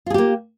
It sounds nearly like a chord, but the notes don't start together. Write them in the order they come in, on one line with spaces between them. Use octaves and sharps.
F4 G#4 G4 A#3